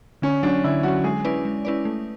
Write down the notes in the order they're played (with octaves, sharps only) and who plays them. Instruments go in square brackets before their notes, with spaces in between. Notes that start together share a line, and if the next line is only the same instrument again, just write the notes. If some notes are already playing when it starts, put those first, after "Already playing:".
[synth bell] D3 [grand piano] C#4
[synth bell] F#3 C#4 [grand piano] D4
[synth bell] D3 [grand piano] E4
[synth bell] F#3 C#4 [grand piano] F#4
[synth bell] G#3 [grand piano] G#4
[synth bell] C#4 E4 B4 D5
G#3
C#4 E4 B4 D5
A3